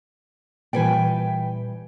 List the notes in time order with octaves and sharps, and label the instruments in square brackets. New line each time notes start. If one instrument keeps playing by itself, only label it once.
[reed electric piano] A#2 [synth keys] E3 G5 [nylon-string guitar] G3 B4 G#5